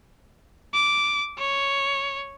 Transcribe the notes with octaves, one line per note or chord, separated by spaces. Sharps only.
D6
C#5